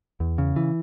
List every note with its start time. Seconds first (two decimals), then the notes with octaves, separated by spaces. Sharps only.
0.20 E2
0.38 C#3
0.56 E3